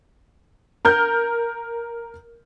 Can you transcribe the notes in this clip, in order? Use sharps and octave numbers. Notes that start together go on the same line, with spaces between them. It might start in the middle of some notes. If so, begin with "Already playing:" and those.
A#4 F6 G6